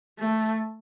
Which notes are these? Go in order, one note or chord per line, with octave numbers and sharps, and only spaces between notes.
A3